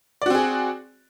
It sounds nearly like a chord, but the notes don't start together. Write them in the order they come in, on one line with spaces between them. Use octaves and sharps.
D5 F#4 C4 G#4